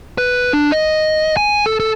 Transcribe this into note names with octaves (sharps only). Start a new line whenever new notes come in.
B4
D4
D#5
G#5
A4
A4